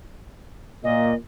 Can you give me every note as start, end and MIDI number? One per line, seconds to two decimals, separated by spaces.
0.84 1.14 46
0.84 1.14 75